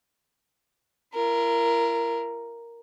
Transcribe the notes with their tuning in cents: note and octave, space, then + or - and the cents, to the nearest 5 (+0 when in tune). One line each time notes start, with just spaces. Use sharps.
E4 +45 A#4 +0